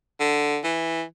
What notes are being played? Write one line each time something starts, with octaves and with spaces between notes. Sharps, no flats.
D3
E3